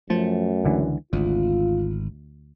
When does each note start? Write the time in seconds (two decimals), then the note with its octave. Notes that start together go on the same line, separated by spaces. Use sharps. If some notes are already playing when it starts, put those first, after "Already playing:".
0.10 F#2 F3 A3
0.65 C#2 D3 E3
1.13 G#1 D2 F4